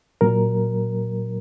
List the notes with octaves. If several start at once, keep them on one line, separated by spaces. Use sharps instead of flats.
A#2 F#3 A#4